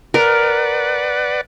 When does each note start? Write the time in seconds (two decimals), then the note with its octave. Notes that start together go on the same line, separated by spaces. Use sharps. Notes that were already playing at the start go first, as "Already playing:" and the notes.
0.14 A#4 B4 D5 F#5